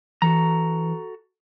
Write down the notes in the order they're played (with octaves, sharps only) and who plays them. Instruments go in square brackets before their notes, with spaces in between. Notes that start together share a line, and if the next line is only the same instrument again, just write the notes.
[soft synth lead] E3 [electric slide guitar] F#4 A4 A#5